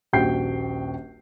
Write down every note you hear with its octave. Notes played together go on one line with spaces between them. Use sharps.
D#1 A#1 F#4 G5 G6 C7